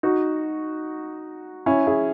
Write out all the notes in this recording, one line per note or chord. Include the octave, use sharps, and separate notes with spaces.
D#4 F#4
C#4 E4
E4 G#4